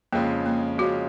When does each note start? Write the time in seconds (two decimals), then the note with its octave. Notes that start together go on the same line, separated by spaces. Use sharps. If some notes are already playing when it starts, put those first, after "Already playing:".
0.13 F2 C#3 G#3 A#3 C#4 F4
0.46 A#3
0.78 F2 C#3 G#3 C#4 F4 F#4